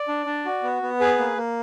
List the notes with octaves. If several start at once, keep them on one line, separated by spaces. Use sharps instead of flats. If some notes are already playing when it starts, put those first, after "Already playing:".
Already playing: D5
D4
D4
F#4
B3
B3
G#4 B4
A#3
A#3